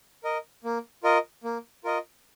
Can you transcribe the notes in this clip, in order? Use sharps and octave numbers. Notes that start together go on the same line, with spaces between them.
A#4 D#5
A#3
F4 A#4 D#5
A#3
F4 A#4 D#5